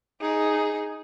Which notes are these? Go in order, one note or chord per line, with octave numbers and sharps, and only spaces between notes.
D#4 G#4